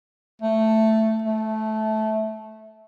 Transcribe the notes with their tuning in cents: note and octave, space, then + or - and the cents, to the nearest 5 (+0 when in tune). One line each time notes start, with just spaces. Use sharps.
A3 +5
A3 -15